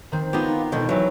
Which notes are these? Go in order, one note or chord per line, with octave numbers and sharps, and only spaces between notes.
D#3 C4
B3 D#4 F4 G4
B2 D3 D#3
E3 F#3 B3